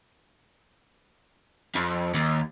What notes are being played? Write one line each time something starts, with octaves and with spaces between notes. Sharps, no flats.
F2
D#2